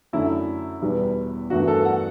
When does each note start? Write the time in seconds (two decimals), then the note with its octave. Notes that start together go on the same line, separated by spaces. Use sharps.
0.13 F#2 D3 A3 E4
0.82 E2 B2 G3 B3
1.50 G2 E3 A3 F#4
1.68 A4
1.85 F#5